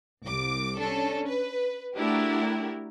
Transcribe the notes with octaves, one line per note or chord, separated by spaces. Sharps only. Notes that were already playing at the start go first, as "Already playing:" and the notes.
C2 D6
C#4 D4 A4
B4
A3 D4 E4 F#4 G4 A#4